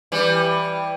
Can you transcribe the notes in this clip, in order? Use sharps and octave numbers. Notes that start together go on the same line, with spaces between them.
E3 G3